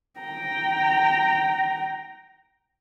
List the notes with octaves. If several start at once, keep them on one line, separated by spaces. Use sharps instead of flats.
G5 A#5